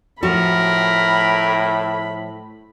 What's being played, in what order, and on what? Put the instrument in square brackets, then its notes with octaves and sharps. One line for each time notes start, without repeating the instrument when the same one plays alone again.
[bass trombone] A2 [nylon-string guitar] F3 F#4 [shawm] A#4 [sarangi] B5